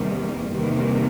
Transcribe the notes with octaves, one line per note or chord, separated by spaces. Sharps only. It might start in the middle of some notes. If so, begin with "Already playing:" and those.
Already playing: E2 C3 D#3 G3 A#3
E2 C3 D#3 G3 A#3